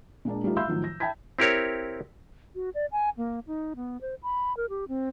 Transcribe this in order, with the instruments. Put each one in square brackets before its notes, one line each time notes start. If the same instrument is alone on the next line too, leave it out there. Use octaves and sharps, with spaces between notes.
[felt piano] A#2 G#3 A#3 D4
G3 A3 D#4 F4 B4
E5 F5 B5 C6 E6 G6
A2 D#3 F3 F#3
A#6
E5 G5 A5 B5 G#6 B6
[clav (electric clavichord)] C4 E4 G4 A#4 C#5
[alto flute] F#4
D5
G#5
A#3
D#4
B3
C5
B5
A#4
G4
C4